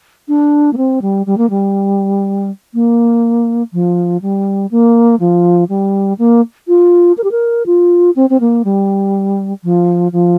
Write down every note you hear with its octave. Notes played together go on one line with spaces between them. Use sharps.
D4
A#3
C4
G3
G3
A#3
G3
A#3
F3
G3
A#3
F3
G3
A#3
F4
A#4
G4
A#4
F4
C4
C4
A#3
G3
F3
F3